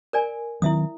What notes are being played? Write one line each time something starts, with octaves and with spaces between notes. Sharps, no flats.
A#4 D5 G#5
D#3 F#3 C4 E4 E5 D#6